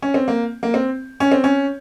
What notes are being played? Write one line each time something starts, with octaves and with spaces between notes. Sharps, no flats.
C#4
C4
A#3
A#3
C4
C#4
C4
C#4